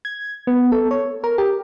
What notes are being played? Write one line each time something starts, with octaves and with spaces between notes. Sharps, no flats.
G#6
B3
A4
C#5
A#4
G4